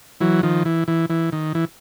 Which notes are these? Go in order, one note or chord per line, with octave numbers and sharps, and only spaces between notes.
E3 F#3
D#3 F3
E3
E3
E3
D#3
E3